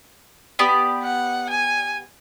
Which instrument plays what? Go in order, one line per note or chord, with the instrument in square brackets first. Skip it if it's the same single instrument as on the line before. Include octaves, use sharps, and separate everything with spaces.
[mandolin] B3 G4 D5
[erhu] F#5
G#5